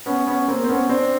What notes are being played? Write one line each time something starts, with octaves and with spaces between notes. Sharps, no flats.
B3 C#4
B3 C#4
A#3 C4
C4
B3 C#4
C4 D4